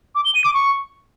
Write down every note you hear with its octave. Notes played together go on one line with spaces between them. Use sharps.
D6
G7
D#7
D6
C#6